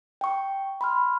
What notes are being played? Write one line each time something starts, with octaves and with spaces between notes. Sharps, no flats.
G5 C#6
B5 C6 F6